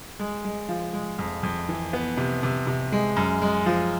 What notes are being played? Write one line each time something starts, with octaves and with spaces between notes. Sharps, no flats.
G#3
G#3
F3
G#3
F2
F2
E3
B3
C3
C3
C3
G#3
F#2
G#3
F3